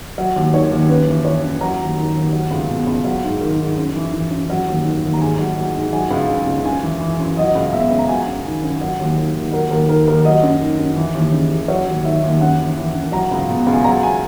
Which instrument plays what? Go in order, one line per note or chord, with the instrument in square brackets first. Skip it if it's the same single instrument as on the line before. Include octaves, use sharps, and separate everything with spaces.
[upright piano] F#3
D#2
D#3 C#5
D#2
F#2 B4
E3
E3 C#5
F#2
F#3 A#5
D#2
D#3
D#2
F#3
C#2
B2
C#2
F#3
G#2
D#3
G#2
F#2
E3
E3
F#2
F#3
D#2
D#3
D#2
A#5
G#2 G#5
F#3
F#3
G#2
F#3 G#5
C#2
C#3
C#2
F#2 G#5
E3
E3
F#2
F#3 D#5
C#2
B2 E5
C#2
A#5
F#3 G#5
F#2
D#3
F#2
F#3
D#2
D#3
D#2
F#3 A#4
D#2 A#4
D#3 A#4
D#2 A#4
F#3 D#5
F#2
D#3
F#2
E3
D#2
C#3
D#2
F#3 C#5
D#2
D#3 E5
D#2
F#2 F#5
E3
E3
F#2
F#3 A#5
C#2
B2
C#2
G#5
F#3 A#5
G#5